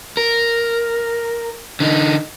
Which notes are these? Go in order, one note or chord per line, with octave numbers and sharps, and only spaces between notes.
A#4
D3 D#4